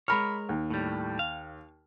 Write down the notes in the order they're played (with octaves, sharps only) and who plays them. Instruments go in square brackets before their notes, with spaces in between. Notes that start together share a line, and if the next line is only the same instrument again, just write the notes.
[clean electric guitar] G#3 A#4 C#5 [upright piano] B5 F6
[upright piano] D#2
[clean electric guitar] A2 G3
F5